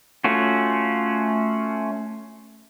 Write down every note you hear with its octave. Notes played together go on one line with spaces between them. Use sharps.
A3 C#4 F4 F#4